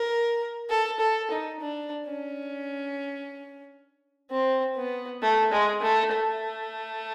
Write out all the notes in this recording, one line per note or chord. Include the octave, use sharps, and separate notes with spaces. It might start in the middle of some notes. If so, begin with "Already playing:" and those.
Already playing: A#4
A4
A4
D#4
D4
C#4
C4
B3
A3
G#3
A3
A3